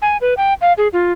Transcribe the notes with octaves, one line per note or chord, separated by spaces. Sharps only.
G#5
B4
G5
F5
G#4
F4